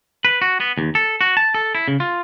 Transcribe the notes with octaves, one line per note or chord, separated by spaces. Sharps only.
B4
F#4
B3
D#2
A4
F#4
A5
A4
E4
C#3
F4